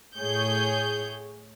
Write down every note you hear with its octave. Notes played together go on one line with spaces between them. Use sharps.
A2 G#4 C#5 G6